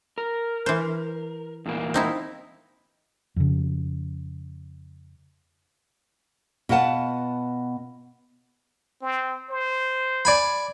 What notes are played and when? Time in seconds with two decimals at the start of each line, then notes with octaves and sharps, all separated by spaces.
0.18 A#4
0.66 E3 C5
1.66 E2 A#2 A#3
1.94 C4 D#4 E4
3.36 F2 C#3
6.69 B2 F4 B4 F#5 A5
9.01 C4
9.50 C5
10.25 D5 G#5 B5